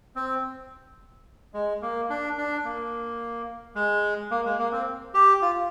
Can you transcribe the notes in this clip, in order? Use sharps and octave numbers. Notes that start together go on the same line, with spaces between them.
C4
G#3
A#3
D4
D4
A#3
G#3
A#3
G#3
A#3
C4
G4
F4